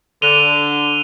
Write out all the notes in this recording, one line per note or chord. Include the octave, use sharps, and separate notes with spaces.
D3 D#7 F7 G7